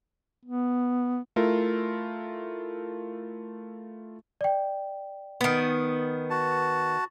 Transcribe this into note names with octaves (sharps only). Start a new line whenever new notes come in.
B3
A3 E4 F4 A#4
D5 G5
D#3 B3
F#4 A5